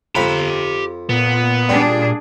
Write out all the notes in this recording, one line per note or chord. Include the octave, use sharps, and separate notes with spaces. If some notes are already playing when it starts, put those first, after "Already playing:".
F2 G4 A#5 B5
A#2 B3
G3 D4 G#4